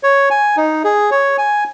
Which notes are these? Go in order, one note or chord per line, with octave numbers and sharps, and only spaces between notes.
C#5
G#5
D#4
G#4
C#5
G#5